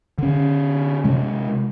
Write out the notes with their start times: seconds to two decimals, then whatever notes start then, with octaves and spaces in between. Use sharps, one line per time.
0.18 D3 C#4
1.04 C3 G#3